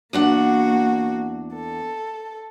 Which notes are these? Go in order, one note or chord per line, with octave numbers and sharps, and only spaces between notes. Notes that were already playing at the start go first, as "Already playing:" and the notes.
E2 A#3 D4 F#4 F#5
A4